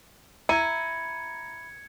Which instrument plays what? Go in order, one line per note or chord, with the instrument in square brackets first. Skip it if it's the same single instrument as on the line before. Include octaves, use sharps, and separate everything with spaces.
[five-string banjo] E4 [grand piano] A#5 D#7 [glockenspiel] G#6 C#7